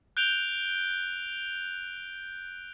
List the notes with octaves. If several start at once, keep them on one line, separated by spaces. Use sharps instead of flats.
F#6 G6 D7 F7 G7